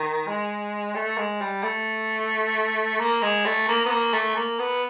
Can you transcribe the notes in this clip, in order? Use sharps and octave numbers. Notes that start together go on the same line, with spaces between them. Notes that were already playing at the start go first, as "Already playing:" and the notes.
Already playing: D#3
G#3
A3
G#3
G3
A3
A#3
G#3
A3
A#3
B3
A#3
A3
A#3
B3